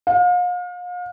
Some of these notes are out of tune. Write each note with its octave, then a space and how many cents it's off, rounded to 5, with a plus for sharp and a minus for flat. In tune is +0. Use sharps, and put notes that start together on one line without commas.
F5 +40